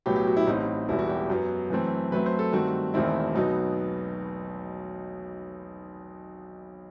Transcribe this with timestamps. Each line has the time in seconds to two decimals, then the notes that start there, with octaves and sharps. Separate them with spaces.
0.06 B1 A2 F#3 B3 G4
0.16 G4
0.27 F#4
0.37 E4
0.47 A1 A2 F#3 C4 D#4
0.88 E1 E2 B2 G3 B3 E4
0.99 F#4
1.09 G4
1.30 F#2 F#3 B3
1.70 F#2 E3 A3 C4
2.12 F#2 F#3 A3 C4 B4
2.26 C5
2.39 A4
2.52 G2 D#3 A3 C4 F#4
2.94 E1 E2 D#3 A3 C4 E4
3.35 B1 B2 F#3 B3 D#4